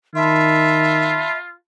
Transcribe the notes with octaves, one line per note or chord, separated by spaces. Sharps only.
D#3 F4 E5 A5 B5 C6